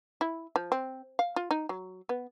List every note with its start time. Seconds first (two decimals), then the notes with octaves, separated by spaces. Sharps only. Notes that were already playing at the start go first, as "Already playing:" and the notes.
0.21 E4
0.56 F3
0.72 C4
1.19 F5
1.36 F4
1.51 D#4
1.69 F#3
2.09 B3